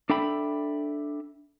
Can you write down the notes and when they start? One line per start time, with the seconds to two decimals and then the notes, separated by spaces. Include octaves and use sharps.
0.10 D4 A4 E5 G5 B5